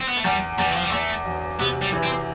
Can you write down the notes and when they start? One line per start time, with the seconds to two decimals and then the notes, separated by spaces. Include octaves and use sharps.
0.01 C4
0.09 B3
0.17 A3
0.25 E2 G3
0.58 E2 G3
0.67 E3
0.75 F3
0.84 G3
0.91 E2 A3
1.26 E1
1.59 C3 B3
1.82 G3
1.93 E3
2.03 C4